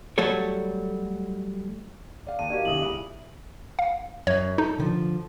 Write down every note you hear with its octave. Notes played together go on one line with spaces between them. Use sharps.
F#3 G3 A3 F#4 A4 C#5
D5 F5
D#2 A5 D#7
D#4 F#4 G4 A#4 D5 F5
B1 D3 E4 E5 D#6 F#7
C#2 E5 G#5 B5
F5
F#2 C#5
D#4 A4
D3 E3 F3